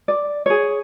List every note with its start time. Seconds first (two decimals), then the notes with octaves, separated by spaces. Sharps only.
0.08 D5
0.46 G#4 C#5